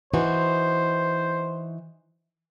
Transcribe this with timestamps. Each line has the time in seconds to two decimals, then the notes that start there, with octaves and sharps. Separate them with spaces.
0.14 E3 D#4 F#4 C5